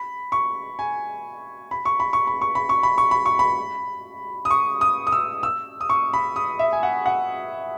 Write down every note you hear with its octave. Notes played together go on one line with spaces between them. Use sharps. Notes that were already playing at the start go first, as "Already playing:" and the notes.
Already playing: B5
C#6
G#5
B5
C#6
B5
C#6
B5
C#6
B5
C#6
B5
C#6
B5
C#6
B5
D#6
C#6
D#6
D#6
E6
E6
D#6
C#6
B5
D#6
E5
G#5
F#5
F#5